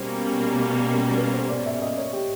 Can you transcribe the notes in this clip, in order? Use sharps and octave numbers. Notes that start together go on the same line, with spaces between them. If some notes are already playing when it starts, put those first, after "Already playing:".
Already playing: B2 G3 A#3 C#4 C5
B4
C5
D5
E5
D#5
C#5
G4